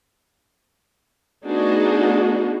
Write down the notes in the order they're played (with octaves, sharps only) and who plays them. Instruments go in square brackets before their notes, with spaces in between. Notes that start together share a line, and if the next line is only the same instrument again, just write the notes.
[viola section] A3 B3 D4 D#4 F#4 G#4